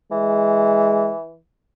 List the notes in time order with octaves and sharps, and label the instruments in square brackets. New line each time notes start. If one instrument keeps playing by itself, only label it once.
[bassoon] E3 [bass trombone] G#3